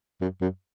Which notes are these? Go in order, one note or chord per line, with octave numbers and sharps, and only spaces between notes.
F#2
F#2